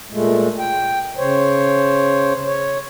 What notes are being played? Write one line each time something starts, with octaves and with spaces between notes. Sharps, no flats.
A#2 G#3 A3
G5
C#3 C5 C#5
C#5